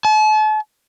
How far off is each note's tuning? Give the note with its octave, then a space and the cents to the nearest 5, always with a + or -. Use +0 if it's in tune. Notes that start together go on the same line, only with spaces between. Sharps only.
A5 -40